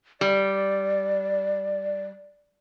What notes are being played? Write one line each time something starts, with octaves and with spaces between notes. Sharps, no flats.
G3 D5